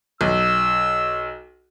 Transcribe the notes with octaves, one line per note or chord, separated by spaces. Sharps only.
B1 E6